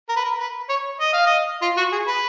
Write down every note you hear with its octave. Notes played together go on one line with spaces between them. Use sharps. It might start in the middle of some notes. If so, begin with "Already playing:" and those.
A#4
B4
A#4
B4
C#5
D#5
F5
D#5
F4
F#4
G#4
B4